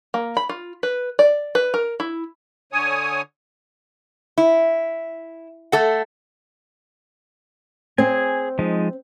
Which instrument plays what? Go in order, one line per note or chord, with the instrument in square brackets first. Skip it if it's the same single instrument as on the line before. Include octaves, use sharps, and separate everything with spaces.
[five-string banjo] A#3
B5
F4
B4
D5
B4
A#4
E4
[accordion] D3 C#5 G#5 D#6
[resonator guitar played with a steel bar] E4
A3 A4 F#5
[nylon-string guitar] C4 [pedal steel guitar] G#4 G#5
[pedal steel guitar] F3 G#3 D#4